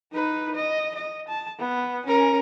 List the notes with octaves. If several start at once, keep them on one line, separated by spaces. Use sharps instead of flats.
D#4 B4
D#5
D#5
A5
B3
C#4 A#4